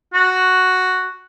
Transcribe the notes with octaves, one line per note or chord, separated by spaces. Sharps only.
F#4